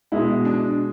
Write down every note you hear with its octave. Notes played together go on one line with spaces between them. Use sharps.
B2 G#3 E4
D4